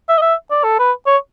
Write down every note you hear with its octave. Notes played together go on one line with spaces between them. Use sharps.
E5
D#5
E5
D5
A4
B4
C#5